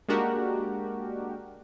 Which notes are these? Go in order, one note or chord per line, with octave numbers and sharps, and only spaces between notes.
G#3 A#3 D4 F#4 G4 A#4